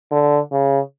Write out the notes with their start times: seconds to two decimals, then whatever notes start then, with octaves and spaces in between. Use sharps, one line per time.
0.11 D3
0.52 C#3